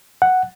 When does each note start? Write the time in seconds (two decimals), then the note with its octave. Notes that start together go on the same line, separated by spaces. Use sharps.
0.22 F#5